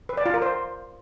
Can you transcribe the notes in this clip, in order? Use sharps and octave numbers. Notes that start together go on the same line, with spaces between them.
B4
D5
F4
A#4
C5